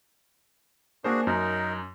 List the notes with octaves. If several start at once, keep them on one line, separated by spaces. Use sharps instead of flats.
A#3 D4 F#4 G#4 A#4 C5
F#2 D#4 A#4